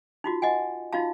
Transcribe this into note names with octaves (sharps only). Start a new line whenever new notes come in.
D#4 F4 F#4
F#4 D#5 F#5 G#5
D#4 F4 F#4 F5 A5